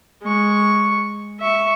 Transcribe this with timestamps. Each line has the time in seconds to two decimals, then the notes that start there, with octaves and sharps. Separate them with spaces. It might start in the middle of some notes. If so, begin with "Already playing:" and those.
0.23 G#3 C#6
1.40 E5 C#6